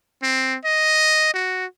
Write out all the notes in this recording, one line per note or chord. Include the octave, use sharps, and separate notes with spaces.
C4
D#5
F#4